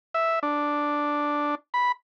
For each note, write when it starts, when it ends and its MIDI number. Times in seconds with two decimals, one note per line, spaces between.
0.14 0.39 76
0.43 1.55 62
1.74 1.92 83